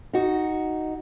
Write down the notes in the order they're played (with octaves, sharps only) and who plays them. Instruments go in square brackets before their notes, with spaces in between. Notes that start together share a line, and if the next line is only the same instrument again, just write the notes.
[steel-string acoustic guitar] D#4 F#4